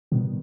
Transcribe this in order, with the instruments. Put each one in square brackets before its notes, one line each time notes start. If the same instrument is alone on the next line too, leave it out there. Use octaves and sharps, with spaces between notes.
[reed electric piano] G#2 D#3 G3 B3 [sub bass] B2